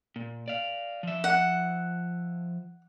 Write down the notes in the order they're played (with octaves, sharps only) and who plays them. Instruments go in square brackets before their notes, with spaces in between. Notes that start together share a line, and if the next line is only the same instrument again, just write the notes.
[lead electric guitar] A#2
D5 F5
F3 E5
[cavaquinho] F#5